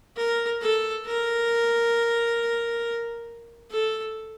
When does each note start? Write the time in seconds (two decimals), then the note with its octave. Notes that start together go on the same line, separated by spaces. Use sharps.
0.17 A#4
0.61 A4
1.06 A#4
3.71 A4